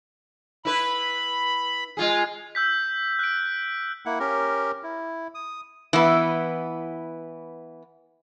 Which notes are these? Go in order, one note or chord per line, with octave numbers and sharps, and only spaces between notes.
E4 B4 B5
G#3 F4 G#4
E6 G6 B6
F#6 D7
A#3 E4 F#5
C#4 G4 A#4
E4
D#6
E3 B3